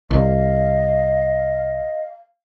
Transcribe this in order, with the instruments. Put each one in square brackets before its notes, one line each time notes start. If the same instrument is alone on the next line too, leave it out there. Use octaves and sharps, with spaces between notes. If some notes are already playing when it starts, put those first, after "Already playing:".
[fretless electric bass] C2 [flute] D#5 [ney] F5